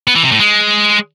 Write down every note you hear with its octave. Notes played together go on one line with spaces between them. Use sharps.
B3
E3
C3
A2
G#3